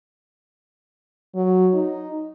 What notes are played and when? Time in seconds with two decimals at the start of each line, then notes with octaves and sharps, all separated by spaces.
1.35 F#3
1.74 D#4